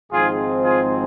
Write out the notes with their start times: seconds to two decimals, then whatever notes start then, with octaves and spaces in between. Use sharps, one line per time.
0.11 G#1 G#2 F3 C4 F4 G#4
0.64 F4 G#4